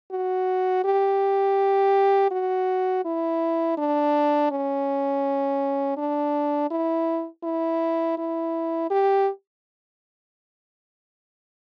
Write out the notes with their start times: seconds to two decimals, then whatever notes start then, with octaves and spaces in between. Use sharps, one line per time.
0.12 F#4
0.84 G4
2.31 F#4
3.05 E4
3.78 D4
4.51 C#4
5.97 D4
6.71 E4
7.43 E4
8.18 E4
8.90 G4